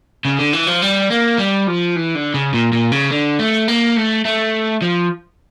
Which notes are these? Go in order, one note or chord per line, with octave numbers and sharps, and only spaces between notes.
C#3
D3
E3
F3
G3
A#3
G3
F3
E3
D3
C#3
A#2
A#2
C#3
D3
A3
A#3
A3
A3
F3